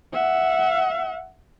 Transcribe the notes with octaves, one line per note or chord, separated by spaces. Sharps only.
E5 F#5